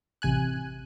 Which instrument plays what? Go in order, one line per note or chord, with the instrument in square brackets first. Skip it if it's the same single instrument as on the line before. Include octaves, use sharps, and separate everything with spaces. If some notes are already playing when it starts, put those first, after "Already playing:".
[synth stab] A1 C3 G#5 F#6